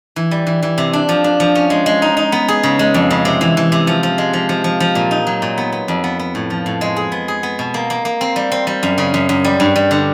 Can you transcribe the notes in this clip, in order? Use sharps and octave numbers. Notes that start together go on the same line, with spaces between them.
E3
G3
E3
E3
C3
D4
F3
D4
F3
C#4
G#3
G#3
D#4
D#4
B3
G#4
C#3
G#3
F2
C#3
C3
E3
E3
C3
F3
F3
G#3
F3
F3
F3
F3
A#2
D#4
F#3
A#2
B3
B3
F2
B3
B3
A2
F3
A2
G#3
G#4
B3
G#4
B3
B2
A#3
A#3
A#3
C4
G3
C4
G3
F#2
C#3
F#2
F#2
G3
G2
G3
D3